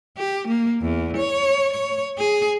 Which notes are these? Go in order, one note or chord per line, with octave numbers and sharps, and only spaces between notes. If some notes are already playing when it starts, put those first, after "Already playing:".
G4
A#3
E2
C#5
C#5
G#4